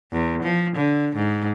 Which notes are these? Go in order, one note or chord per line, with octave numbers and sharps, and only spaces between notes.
E2
F3
D3
G#2